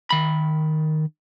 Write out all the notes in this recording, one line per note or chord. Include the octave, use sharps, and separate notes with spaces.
D#3 B5